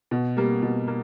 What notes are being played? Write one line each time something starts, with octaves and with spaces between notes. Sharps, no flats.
B2
G3 A#3
B2
A#3